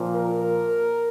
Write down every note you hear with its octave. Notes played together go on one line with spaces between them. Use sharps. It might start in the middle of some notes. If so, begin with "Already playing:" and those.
Already playing: A#2 F3
A#4